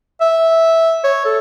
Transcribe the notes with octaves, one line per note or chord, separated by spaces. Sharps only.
E5
C#5
A4